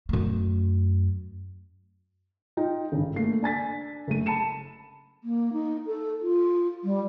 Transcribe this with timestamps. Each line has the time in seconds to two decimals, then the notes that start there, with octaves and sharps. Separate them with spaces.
0.09 F#2 A3
2.57 D#4 F4 G5
2.92 G#1 G2 C#3
3.16 A3 A#3 C7
3.43 D4 G#5 A6 B6
4.07 F#1 A3 D#7
4.26 A5 B5 C#7 E7
5.23 A#3
5.53 D#4
5.87 A4
6.22 F4
6.84 G3